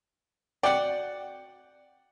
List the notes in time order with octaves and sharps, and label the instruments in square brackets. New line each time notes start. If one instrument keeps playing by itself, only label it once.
[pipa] F#4 D5 [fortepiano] F#5 G5